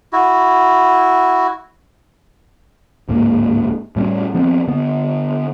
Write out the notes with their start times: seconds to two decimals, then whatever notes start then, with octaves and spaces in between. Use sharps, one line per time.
0.13 E4 F#4
3.09 D1 G#2 A#3
3.96 A2 G3 A#3 C#4
4.34 F3 B3 C4
4.67 D3 B3